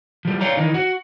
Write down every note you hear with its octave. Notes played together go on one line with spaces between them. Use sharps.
F3 G3
C#5 D5 F5 G5 A#5
D#3 E3 D#4
F#4